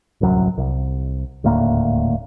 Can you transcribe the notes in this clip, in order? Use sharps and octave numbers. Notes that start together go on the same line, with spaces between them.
D1 C2 F#2 F#3
C2
D#1 D2 A2 A#3